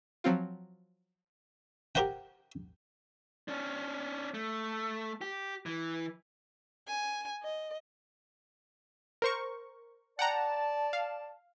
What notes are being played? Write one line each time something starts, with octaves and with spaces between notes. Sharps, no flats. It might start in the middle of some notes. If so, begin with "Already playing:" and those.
F3 F#3 C4 F4
G4 A#4 C5 F#5 G5
C#4 D4
A3
G4
E3
G#5
D#5
A#4 C5 C#6
D5 F#5 G5 A5 A#5
F5